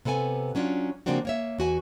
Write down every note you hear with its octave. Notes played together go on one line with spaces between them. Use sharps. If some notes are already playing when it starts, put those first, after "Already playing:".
C3 B3 A4 G5 G#5
F#3 C#4 D4 F4
C#3 F3 A#3 C4 D4 F#4
A#3 C#5 E5
E2 F#4 G#5